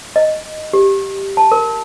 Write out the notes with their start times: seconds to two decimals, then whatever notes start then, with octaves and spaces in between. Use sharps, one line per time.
0.16 D#5
0.73 G4
1.37 A5
1.52 A#4